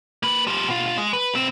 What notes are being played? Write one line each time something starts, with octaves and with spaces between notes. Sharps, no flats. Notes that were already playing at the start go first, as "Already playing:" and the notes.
A#3 B4
F3 G3
B2 F4
G#3
B4
B1 C4